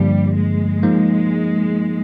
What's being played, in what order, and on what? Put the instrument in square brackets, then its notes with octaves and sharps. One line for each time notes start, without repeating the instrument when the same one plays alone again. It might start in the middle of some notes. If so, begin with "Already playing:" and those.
Already playing: [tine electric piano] G2 D3 F3 A#3 [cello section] G3
[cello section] G#3
[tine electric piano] F3 A#3 D#4